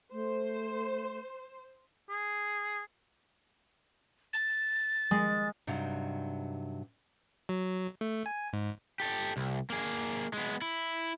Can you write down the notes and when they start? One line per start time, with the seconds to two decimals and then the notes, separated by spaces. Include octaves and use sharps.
0.12 A3 C5
2.10 G#4
4.33 A6
5.11 G#3
5.67 G2 C3 F#3 D4 D#4
7.49 F#3
8.01 A3
8.26 G#5
8.53 G#2
9.00 G4 A4
9.37 C2
9.70 A#3 G#4
10.33 G#3 B3
10.62 E4